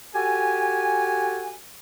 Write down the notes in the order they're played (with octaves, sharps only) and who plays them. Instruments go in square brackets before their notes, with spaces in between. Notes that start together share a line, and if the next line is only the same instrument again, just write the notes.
[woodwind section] F#4 G4 A4 G#5